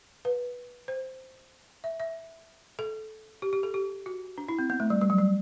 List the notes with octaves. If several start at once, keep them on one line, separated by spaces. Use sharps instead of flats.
B4
C5
E5
E5
A4
G4
G4
A4
G4
F#4
D4
E4
C4
B3
A3
G3
G3
F#3
G3